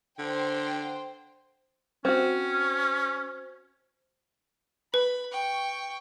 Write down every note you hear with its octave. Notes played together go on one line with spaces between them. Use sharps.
D3 C5 G5
C4 C#4 F#4
B4 B5
G5 C#6